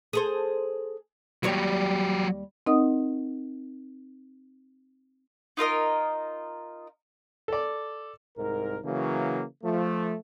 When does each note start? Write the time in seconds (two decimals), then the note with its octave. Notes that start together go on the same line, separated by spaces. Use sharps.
0.13 G#4 A4 C5
1.43 D#2 F#3 G3 G4 C#5
2.66 C4 D#4 A#4 D#5 F#5 D#6
5.57 D#4 F4 A#4 D#5
7.48 A4 D5
8.37 C2 G#2 A#4
8.84 C#3 E3 F#3 A#3
9.63 F3 A3